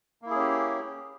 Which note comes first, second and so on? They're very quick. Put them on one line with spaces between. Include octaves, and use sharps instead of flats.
A#3 E4 G#4 C#4 G4